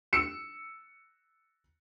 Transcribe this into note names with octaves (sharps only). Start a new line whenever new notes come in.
E6 C#7 E7